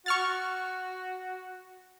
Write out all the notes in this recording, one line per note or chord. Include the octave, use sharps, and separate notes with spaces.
F#4 C#6 F6 A6